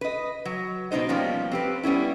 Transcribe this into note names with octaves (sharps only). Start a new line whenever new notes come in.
B4 D#5
F#3
B2 C#4 D#4 C5 D#5
F3 G3 A#3 B3 C#4
C4 G4 B4
G3 B3 C#4 E4